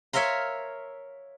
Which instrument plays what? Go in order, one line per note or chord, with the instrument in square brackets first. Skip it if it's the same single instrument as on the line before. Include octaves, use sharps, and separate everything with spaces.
[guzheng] A#4 C#5 E5 F5 A#5 C6